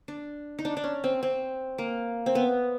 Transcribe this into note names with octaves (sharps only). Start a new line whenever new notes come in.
D4
D#4
D4
D4
C#4
C4
C4
A#3
C4
B3